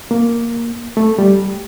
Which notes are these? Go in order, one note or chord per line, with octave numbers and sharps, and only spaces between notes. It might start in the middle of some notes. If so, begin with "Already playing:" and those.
A#3
A3
G3